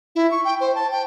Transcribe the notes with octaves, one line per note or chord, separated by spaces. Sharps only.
E4
C#6
G5
C5
A5
G5